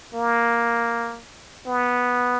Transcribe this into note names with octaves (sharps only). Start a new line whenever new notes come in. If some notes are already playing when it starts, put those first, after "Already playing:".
A#3
B3